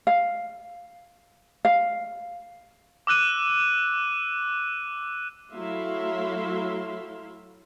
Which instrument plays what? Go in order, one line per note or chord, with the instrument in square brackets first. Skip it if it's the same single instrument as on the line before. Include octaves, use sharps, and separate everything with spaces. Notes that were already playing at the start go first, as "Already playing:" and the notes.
[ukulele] F5
F5
[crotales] D6 E6 F#6 D#7
[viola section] F#3 A3 E4 E5 F5 C6